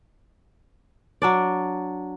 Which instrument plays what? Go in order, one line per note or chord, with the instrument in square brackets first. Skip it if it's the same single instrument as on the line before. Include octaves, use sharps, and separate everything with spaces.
[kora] F#3 D4 D5